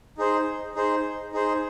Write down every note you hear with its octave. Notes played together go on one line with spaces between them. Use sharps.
D#4 G#4 C5
D#4 G#4 C5
D#4 G#4 C5